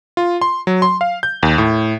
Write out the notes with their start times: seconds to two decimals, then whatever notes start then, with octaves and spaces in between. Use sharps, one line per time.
0.17 F4
0.42 C6
0.67 F#3
0.82 C6
1.01 F5
1.23 G6
1.43 D#2
1.58 A2